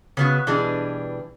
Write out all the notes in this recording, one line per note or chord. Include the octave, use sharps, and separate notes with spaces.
C#3 B3 F#4
B2 E3 G3 D4 G#4